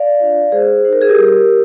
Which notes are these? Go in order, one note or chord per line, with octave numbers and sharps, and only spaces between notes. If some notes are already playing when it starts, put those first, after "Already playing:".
Already playing: D5 F5
D4 F4
G#3 G#4 C5
D#4 C5
A#4
G#4
G4 A#4
G3